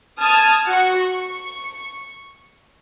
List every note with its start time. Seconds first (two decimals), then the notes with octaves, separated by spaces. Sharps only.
0.21 A5 D#6 F6 G#6
0.68 F#4 F#5 C#6
0.98 C#6